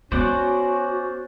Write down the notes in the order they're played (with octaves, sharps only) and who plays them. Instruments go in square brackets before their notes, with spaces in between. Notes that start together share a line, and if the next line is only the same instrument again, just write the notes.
[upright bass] B3 [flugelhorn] C#4 [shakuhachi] F#4 [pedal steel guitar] C5 D5 F#5